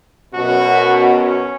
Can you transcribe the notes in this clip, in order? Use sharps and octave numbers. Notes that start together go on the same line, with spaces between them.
F#2 B2 F#4
C#4